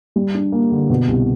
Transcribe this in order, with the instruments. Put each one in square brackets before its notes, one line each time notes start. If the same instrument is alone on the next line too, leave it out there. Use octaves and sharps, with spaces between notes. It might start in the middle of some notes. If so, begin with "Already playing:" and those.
[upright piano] G3
D4
A#3
D3
B2
C2